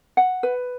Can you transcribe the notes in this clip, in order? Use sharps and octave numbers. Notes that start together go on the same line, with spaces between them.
F#5
B4